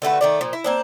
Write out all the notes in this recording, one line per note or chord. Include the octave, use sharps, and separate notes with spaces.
D3 A3 F#4 B4
D#3 A3 D5
A#2 F3
E4
A#3 C4 D4